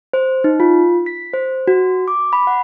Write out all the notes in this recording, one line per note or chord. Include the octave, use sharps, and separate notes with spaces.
C5
D#4
F4
B6
C5
F#4
D6
B5
F#5